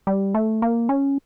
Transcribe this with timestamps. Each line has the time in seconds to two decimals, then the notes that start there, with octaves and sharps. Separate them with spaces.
0.07 G3
0.35 A3
0.62 A#3
0.89 C#4